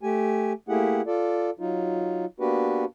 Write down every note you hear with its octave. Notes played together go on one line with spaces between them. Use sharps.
A3 G4 G#5
A3 A#3 E4 G4 G#4 F#5
F4 A4 D5
F#3 D#4 F4
A#3 B3 D4 F#4 G4 B4